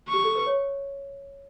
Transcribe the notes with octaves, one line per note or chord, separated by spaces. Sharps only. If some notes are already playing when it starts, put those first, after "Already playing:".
C#6
G4
A4
B4
C#5